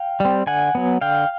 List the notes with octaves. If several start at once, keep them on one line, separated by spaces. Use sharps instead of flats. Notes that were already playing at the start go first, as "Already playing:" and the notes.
Already playing: F5 G5
G3 C4
D3 F#5 G#5
F#3 B3
D3 F5 G5